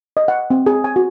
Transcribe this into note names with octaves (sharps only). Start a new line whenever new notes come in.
D#5
F#5
C4
G#4
G#5
F#4